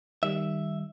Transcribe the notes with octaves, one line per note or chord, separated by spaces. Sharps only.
D#3 G3 E5